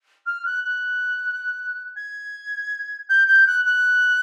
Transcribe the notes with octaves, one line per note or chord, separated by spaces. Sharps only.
F6
F#6
F#6
G#6
G6
G6
F#6
F#6